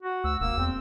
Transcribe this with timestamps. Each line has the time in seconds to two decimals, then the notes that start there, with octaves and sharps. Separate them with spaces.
0.03 F#4
0.24 D2 E6
0.40 E1 A#3 E6
0.57 E2 C4